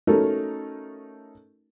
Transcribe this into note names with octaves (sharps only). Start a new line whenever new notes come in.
A3 C#4 D#4 F#4 A4 A#4